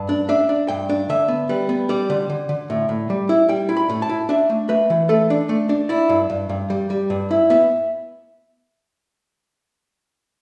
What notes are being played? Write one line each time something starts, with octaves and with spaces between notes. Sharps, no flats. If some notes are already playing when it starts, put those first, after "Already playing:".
Already playing: G2 A5
D4
D4 E5
D4
G2 G5
D4
D3 E5
B3
G3 B4
B3
G3 D5
D3
D3
D3
A2
A2
G3
E4
G3 G5
E4
B5
A2
A5
E4
D4 E5
A3
A3 B4
E3
A3 A4
D4
A3
D4
E4 D5
G2
G2
G2
G3
G3
G2
E4
B3 E5